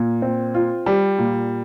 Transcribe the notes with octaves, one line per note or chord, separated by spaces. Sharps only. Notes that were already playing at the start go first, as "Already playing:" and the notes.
Already playing: A#2
C4
F4
G3
A#2